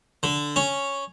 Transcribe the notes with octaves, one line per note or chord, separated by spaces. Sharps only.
D3
C#4